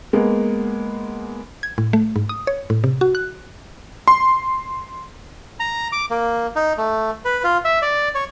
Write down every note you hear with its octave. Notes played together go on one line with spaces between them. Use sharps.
G#3 A#3 B3
G#6
A2
A3
G#2
D#6
C#5
A2
C3
F#4
F#6
C6
A#5
D6
A#3
D#4
A3
B4
F4
E5
D5
C#5